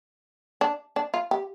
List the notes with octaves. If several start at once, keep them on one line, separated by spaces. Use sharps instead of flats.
D4
D4
F4
G4